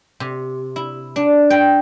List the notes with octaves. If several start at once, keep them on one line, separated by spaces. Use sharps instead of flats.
C3
E4
D4
G5